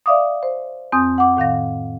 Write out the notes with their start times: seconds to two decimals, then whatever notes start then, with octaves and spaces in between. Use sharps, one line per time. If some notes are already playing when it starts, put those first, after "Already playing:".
0.06 D5 E5 F5 D6 D#6
0.43 C5
0.92 F2 C4 G#5 D#6 G6
1.18 F#5 D6
1.37 A2 D#3 F5 A#6